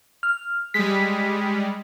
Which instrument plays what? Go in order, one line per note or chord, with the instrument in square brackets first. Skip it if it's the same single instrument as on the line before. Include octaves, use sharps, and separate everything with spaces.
[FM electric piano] F6
[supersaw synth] G3 G#3 [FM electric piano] B6